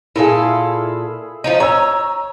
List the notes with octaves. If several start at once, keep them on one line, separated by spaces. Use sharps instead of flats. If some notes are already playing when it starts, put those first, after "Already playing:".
A#2 E4 G#4 A4 F5
F3 C#4 D#4
C#5 A#5 E6